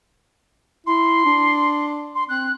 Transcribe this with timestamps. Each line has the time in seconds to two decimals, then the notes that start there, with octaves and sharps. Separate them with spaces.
0.86 E4 C6
1.25 D4
2.15 C6
2.29 C4 F#6